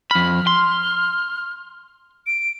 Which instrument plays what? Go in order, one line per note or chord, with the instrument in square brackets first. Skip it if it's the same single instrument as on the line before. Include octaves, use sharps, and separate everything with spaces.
[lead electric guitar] F2 B5 [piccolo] F6
[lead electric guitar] C6
[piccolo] D7